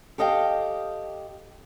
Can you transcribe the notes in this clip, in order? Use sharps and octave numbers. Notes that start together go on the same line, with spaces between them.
G4 A4 D#5 F5 G5